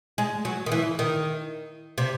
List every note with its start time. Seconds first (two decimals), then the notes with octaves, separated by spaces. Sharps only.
0.18 G#3
0.45 F#3
0.66 D#3
0.72 E3
0.99 D#3
1.98 C3